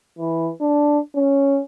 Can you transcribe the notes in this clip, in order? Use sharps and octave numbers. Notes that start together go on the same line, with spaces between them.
E3
D4
C#4